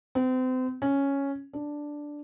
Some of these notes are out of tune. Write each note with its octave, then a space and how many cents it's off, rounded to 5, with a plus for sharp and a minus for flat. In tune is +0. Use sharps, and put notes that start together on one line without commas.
C4 -35
C#4 +0
D4 +0